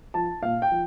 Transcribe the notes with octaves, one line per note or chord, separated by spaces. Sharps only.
F3 A5
A#2 F5
G5
F3